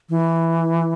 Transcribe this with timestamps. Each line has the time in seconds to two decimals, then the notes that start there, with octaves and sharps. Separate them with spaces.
0.10 E3